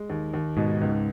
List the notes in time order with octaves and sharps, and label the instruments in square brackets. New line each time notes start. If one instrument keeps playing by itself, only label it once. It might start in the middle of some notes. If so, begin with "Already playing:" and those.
Already playing: [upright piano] G#3
D#2
D#2
[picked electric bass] G#2 [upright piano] B2
[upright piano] C#2